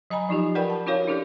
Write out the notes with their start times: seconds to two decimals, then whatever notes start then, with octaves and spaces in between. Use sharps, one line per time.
0.10 F#3 D#5 G#5 A#5 B5
0.29 F3 D#4 F4 G4
0.55 A#4 B4 D5 F#5 G5 B5
0.70 A5
0.86 C#4 E4 F#4 A#4 C#5 F5
1.08 D4 E4 G4 A4 A#4 D5